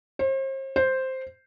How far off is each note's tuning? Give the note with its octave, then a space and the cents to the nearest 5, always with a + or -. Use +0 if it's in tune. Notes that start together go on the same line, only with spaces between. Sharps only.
C5 +40
C5 +0